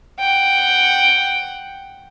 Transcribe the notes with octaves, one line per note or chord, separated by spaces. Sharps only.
F#5 G5